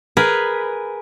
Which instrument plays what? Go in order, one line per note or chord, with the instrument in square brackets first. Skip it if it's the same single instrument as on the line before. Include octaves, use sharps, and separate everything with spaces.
[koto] G#4 A#4 B4